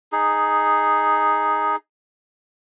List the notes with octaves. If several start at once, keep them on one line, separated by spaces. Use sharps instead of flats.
D#4 G#4